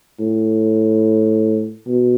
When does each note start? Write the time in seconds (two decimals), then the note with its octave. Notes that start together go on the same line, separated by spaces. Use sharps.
0.20 A2
1.87 B2